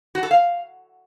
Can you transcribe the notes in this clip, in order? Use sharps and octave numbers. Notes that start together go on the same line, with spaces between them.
F#4
A4
F5